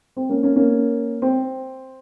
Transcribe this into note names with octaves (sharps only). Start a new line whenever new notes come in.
C4
A#3 C#4
A#3 C#4
A#3 C#4
C4